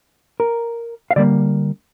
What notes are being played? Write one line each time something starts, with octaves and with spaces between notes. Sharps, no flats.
A#4
F5
D3 G3 A#3 D5